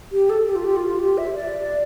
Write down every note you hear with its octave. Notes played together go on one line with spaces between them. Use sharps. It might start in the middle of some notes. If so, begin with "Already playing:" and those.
G4
A4
G4
F4
G4
F4
F4
G4
E5
D5